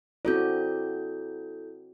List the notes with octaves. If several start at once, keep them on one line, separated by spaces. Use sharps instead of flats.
C4 E4 F#4 A4 D5 G6